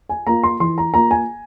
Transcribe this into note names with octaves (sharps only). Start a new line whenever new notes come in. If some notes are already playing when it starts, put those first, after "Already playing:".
G#5
A#3 F4 A#5
C6
E3 C6
A#5
A#3 F4 A#5
G#5